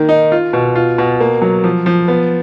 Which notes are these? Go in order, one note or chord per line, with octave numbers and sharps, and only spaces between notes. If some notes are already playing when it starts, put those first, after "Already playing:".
Already playing: D#3 A#3
D#4
F4
B2
F4
B2
A#3
F#3
F3
F3
B3